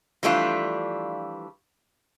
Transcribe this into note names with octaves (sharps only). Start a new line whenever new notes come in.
E3 F3 G3 A3 D4 F4